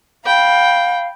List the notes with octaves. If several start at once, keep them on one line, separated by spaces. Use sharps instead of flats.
F5 G5 B5